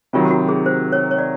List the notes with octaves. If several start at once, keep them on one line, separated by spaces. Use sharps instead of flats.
C3 D#3 F#3 F4
G4
F#4
G#4
C5
C#5
C#5
D5